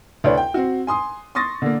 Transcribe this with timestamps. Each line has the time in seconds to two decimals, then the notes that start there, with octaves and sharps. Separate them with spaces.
0.24 D2 D4 B4 C#5 D5
0.37 G5
0.54 C4 F#4
0.87 G#5 C6 D#6
1.35 C6 C#6 D#6 A6 A#6
1.62 D3 A#3